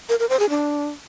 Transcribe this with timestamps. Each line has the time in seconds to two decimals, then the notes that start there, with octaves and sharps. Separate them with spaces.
0.09 A#4
0.19 A#4
0.29 C5
0.40 G#4
0.50 D4